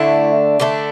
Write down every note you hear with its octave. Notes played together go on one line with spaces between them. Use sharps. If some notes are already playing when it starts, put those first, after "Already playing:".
Already playing: D3 A3 D4 E4
D3 A3 D4